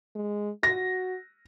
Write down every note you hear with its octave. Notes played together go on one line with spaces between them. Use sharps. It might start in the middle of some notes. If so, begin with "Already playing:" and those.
G#3
F#4 A#6